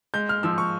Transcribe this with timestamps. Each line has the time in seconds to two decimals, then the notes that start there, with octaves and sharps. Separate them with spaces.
0.14 G#3 G6
0.29 F6
0.43 F3 E6
0.58 C#6